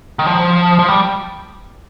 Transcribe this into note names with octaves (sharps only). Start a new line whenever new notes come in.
D#3
F3
F3
G3